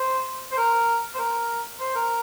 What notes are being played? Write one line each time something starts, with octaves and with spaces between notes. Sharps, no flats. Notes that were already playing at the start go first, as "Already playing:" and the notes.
Already playing: C5
C5
A#4
C5
A#4
C5
A#4